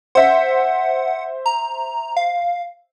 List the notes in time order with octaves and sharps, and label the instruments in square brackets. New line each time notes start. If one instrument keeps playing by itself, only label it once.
[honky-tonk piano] C5 E5 [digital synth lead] F#5
[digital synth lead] A#5
F5